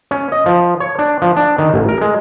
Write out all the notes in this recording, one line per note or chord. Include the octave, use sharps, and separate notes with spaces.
C#4
D#5
F3
C#5
D4
F3
D4
D#3
A1
A#4
G#3